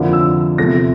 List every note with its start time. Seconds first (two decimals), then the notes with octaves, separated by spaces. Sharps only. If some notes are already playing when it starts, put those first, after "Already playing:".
Already playing: F2 D3 F3 A#3 E4
0.13 E6
0.58 E2 C3 F3 A3 A#6